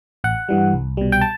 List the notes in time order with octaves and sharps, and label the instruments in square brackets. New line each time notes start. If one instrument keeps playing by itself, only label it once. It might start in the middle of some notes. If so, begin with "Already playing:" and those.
[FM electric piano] A1 F#5
G2 E3 G3
C2
B2 G3
G5
A5